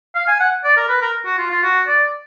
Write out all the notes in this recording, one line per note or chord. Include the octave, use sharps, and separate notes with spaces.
F5
G#5
F#5
D5
A#4
B4
A#4
F#4
F4
F4
F#4
D5